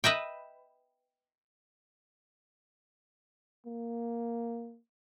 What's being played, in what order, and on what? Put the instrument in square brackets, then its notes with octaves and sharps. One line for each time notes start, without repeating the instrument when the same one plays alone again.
[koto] B4 D#5 E5 G5
[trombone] A#3